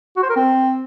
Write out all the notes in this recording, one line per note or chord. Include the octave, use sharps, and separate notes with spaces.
F#4
C5
A#4
C4